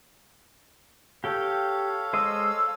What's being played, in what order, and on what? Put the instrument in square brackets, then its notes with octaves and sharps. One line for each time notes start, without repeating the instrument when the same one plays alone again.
[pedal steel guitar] G4 G5 [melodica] A4 C#5 F5
[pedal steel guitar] G#3 C5 D#5 [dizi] E6